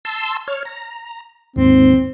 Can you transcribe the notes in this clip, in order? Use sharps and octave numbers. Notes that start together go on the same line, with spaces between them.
A5 C6 E6
C#5 F6
A#5
D#2 G#2 C4